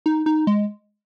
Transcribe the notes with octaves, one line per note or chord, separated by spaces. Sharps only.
D#4
D#4
G#3